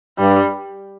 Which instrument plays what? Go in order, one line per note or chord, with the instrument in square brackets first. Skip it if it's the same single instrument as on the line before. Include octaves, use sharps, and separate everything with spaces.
[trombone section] G2 [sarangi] G3